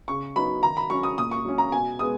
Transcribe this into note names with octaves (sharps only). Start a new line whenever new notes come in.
C#3 C#6
F#3 B3 D#4 B5
D#3 A#5
B5
F#3 C#4 C#6
D#6
A#2 D#6
C#6
F#3 C#4
A#5
B2 G#5
G#3 B3 D#6